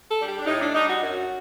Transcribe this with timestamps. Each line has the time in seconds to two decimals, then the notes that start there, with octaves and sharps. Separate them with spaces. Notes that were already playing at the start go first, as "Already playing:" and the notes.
0.10 A4
0.19 G3 D4
0.28 G4
0.39 D4
0.46 A2 D#4
0.61 D4
0.74 G3 D4 D#4
0.87 F#4
1.01 F#2 F#4